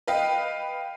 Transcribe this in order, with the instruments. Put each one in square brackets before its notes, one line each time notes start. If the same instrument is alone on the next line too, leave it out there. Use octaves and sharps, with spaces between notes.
[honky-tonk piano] B4 D#5 F5 G5